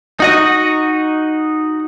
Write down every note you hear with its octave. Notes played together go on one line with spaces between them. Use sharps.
D#4 F#4 D#5